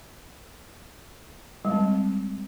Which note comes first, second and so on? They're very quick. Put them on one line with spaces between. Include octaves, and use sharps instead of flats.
G3 G#3 C4